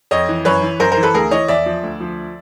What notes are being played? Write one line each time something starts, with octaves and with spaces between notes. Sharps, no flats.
F2 C#5 D#5
E3
F#2 B4 C#5
E3
F#2 A#4 C5
A#4 C5
E3
A4 B4
D2 G#4 A#4
E3 C#5 D#5
E2 D5 E5
F3
D2
F3